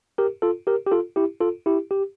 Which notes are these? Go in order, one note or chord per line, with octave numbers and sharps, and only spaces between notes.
G4 A#4
F4 A4
G4 A#4
G4
F4 A4
E4 G4
F4 A4
E4 G4
G4